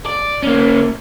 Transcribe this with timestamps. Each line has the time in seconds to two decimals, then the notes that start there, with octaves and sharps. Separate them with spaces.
0.06 D5
0.43 A#3 C#4